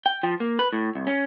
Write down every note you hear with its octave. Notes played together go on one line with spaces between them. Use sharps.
G5
F3
A#3
B4
A2
C2
C#4